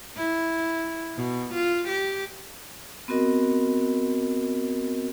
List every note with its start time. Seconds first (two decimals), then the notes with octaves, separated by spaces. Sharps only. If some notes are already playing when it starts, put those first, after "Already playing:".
0.16 E4
1.16 B2
1.54 F4
1.88 G4
3.08 B3 C4 F#4 A#4 D#5